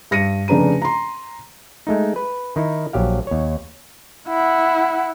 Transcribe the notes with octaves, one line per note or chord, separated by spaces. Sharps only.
G2 A#6 C#7 D#7
F1 C#3 D4 B4 A#5 D#7
A#5 C6
G#3 A3 D#4
B4
D#3 D#4 E4
A#1 F#3 G4 F5
D#2 C#5
E4 F#5